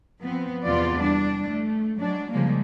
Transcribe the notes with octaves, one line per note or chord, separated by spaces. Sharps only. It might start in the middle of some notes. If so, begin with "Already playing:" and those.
F3 B3 C4
E2 C3 E3 B3 F4 D5
G3 D4
A3
F#3 G#3 D4
C#3 F3 G3 G#3 A#3